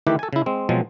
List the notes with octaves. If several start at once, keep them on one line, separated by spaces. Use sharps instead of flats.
D#3 E3 A3 E4 G4 B4
A4 G#5
C#3 E4
G#3 C4
B2 F3 F#3 G#3 C4